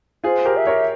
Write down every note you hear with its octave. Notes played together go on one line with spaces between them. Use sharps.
F4 G#4 C5
G4 A#4
E5
A#4 C#5